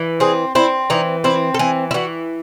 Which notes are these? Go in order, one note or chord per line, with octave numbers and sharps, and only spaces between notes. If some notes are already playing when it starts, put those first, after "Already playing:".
Already playing: E3
C4 G#4
C4 E4
E3 D#4
C4 E4
A4
E3 G#4
E4
E3 F#4